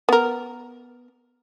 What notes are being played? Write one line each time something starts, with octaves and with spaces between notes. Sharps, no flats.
B3 A#4